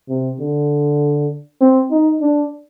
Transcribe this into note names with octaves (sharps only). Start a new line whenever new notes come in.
C3
D3
C4
D#4
D4